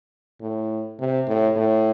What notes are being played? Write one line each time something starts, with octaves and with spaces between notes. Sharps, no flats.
A2
C3
A2
A2